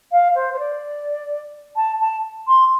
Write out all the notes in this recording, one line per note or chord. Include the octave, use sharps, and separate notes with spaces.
F5
C5
C5
D5
A5
A5
C6